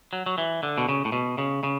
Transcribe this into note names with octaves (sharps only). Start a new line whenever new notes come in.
F#3
F#3
E3
D3
B2
C#3
A2
B2
C#3
C#3